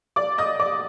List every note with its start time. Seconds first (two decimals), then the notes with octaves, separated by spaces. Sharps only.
0.16 D5 D6
0.38 D#5 D#6
0.60 D5 D6